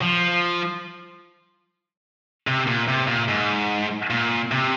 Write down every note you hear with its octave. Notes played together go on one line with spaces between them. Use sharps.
F3
C3
A#2
C3
A#2
G#2
A#2
C3